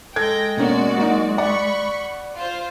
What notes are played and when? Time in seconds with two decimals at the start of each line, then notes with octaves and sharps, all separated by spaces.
0.16 G#3 A4 G5 G#6 A#6
0.57 B2 A#3 C#4 F#4 D5
0.98 F#3 A#3 D#4
1.38 D5 F#5 B5 C#6
2.35 F4 C5